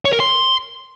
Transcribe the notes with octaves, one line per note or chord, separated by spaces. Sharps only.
C#5
A#4
C6